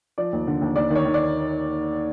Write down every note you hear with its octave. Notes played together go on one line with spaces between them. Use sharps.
F3 D5
D#2
D3
D#2
D#2 D5
D#3
C#5
D#3
D5